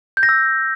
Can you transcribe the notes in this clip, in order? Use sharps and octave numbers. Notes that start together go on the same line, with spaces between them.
G6
A#6
E6